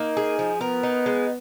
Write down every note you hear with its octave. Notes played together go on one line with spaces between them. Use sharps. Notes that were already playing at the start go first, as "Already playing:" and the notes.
Already playing: A#3 D#4
G#4
F3
B3 A#4
D#4
G#3